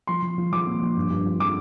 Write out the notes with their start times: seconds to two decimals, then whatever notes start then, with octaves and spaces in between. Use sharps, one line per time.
0.07 F3 C6
0.22 F3
0.38 F3
0.52 F3 D6
0.67 A#2
0.82 F3
0.96 G2
1.10 G2
1.25 F3
1.40 F3 D6